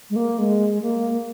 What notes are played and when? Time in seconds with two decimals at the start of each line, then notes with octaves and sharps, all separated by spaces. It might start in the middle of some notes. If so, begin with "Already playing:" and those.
0.10 G#3
0.16 A#3
0.38 G#3
0.82 A#3